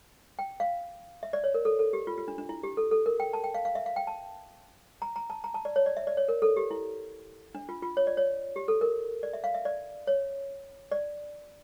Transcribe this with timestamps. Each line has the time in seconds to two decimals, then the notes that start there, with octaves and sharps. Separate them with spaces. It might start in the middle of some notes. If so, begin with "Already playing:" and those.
0.39 G5
0.60 F5
1.23 E5
1.33 D5
1.44 C#5
1.54 A#4
1.65 A4
1.79 A4
1.93 G4
2.07 F4
2.18 F4
2.28 D4
2.38 D4
2.49 E4
2.63 G4
2.77 A4
2.91 A4
3.06 A#4
3.20 G5
3.33 A5
3.44 G5
3.54 F5
3.65 F5
3.75 E5
3.86 F5
3.96 G5
4.07 A5
5.02 A#5
5.16 A#5
5.30 A5
5.44 A#5
5.54 A5
5.65 D5
5.76 C#5
5.86 D5
5.97 E5
6.07 D5
6.17 C#5
6.28 A#4
6.42 A4
6.56 G4
6.71 E4
7.55 D4
7.69 F4
7.83 F4
7.97 C#5
8.07 D5
8.17 C#5
8.56 G4
8.68 A4
8.81 A#4
9.23 D5
9.33 E5
9.44 F5
9.54 E5
9.65 D5
10.07 C#5
10.92 D5